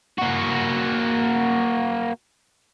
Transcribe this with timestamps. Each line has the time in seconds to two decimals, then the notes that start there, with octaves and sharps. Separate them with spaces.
0.18 A#3 F#4